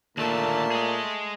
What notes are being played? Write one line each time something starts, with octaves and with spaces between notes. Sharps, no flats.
D#2 A#2 D3 A3 A5
G#4 D#5